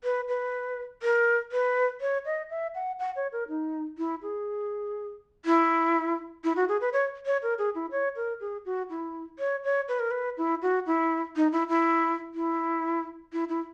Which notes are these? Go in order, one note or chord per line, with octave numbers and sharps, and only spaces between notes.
B4
B4
A#4
B4
C#5
D#5
E5
F#5
F#5
C#5
A#4
D#4
E4
G#4
E4
E4
F#4
G#4
B4
C#5
C#5
A#4
G#4
E4
C#5
A#4
G#4
F#4
E4
C#5
C#5
B4
A#4
B4
E4
F#4
E4
D#4
E4
E4
E4
E4
E4